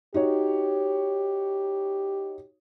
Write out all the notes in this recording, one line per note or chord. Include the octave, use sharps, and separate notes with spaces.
D#4 F#4 G4 C#5